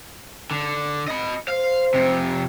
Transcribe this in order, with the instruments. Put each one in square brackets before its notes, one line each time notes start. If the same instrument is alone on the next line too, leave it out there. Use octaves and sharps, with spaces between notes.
[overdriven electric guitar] D3
D#5 B5
[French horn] C5 [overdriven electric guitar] F5
[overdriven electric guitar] F2 C3